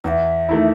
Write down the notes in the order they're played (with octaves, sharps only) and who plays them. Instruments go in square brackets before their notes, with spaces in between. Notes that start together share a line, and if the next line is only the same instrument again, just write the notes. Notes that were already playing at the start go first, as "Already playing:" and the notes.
[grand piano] E2 [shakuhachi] F#5
[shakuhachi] E5
[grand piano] D#3 A3 E4